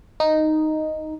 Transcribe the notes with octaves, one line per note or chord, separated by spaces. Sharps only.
D#4